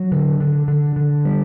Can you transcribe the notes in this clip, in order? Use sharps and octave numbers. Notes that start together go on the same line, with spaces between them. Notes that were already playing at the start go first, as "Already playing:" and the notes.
Already playing: F#3
D3
D3
D3
D3
G3